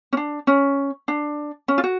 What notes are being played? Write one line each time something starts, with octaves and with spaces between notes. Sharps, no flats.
C#4
D4
C#4
D4
C#4
F4
F#4